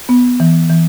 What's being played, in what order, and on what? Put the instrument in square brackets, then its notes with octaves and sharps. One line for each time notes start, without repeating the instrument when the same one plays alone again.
[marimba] B3
E3
E3